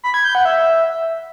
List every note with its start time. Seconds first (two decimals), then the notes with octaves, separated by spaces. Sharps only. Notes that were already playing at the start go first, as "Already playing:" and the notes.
0.04 B5
0.14 G#6
0.24 G6
0.35 F#5
0.45 E5